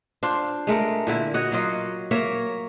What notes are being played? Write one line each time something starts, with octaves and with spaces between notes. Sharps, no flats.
D4 F4 C5
G#3 A3 A#4
A#2 D3 E4
F#4 C#5 D#5 F#5
F#3 A#3 F4 D#5
A#3 A#4 C#5 E5